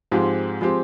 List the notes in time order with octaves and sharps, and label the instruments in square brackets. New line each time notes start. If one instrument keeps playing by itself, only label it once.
[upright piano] G#2 F3 G#3 C4 G4
F3 G#3 C4 G4